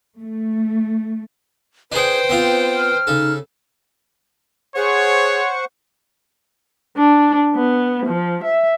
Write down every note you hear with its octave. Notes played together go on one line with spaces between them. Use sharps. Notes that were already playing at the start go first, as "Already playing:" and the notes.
A3
D4 G#4 B4 C5 G5
B3 C4 F4
F6
C#3 D#4 A4
G#4 C5 C#5 F#5 C#6
D4
B3
F3
E5